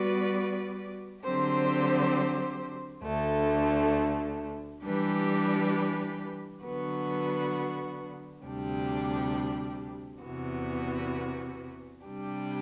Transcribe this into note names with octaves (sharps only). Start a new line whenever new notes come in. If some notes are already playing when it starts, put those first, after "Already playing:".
Already playing: G3 B3 F#4 B4 D5
D3 F#3 C4 G4 C5
D2 D3 A3
E3 G3 D4 G4 B4
D3 F#3 B3 F#4 B4
D2 C3 G3 D4 G4
E2 C3 E3 B3 F#4
C3 G3 D4 G4